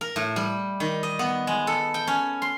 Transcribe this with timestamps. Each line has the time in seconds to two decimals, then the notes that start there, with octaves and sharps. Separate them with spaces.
0.01 A#4
0.16 A2
0.36 G3
0.80 D#3
1.03 D#5
1.19 B3
1.47 G#3
1.67 A4
1.94 G5
2.07 C#4
2.42 C6